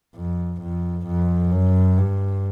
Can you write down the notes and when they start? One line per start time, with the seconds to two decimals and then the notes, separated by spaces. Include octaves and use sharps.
0.16 F2
0.62 F2
1.06 F2
1.52 F#2
1.98 G2